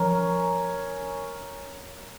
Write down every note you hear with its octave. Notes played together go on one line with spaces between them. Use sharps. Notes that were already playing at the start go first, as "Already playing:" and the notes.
Already playing: F3 C#4 A#4